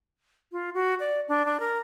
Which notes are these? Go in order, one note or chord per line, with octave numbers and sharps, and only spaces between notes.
F4
F#4
D5
D4
D4
A#4